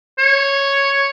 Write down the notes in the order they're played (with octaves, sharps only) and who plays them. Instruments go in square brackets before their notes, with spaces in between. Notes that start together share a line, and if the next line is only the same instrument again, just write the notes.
[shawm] C#5